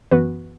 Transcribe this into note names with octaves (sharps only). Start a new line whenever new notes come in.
F#2 E3 B3 F#4 B4